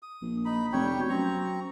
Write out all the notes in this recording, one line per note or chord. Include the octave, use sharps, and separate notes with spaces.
D#6
A#1
D#4 B5
F1 G3 C#5 G5
B2
F#2 C4 A#5 C#6